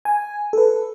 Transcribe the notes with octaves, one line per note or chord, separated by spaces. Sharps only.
G#5
A4 B4